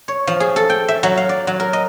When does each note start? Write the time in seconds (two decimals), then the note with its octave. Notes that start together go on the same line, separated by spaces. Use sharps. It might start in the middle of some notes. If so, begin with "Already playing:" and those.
0.08 C#5
0.27 F3
0.40 G#4
0.56 A4
0.70 G5
0.88 E5
1.03 F#3
1.17 F5
1.29 D5
1.47 F#3
1.60 A#4
1.73 D#5